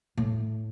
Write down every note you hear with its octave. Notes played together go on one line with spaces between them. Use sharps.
A2